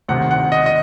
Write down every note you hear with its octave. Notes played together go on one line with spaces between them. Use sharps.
D2 C3 D#3 F#5
F#5
D#5
D#5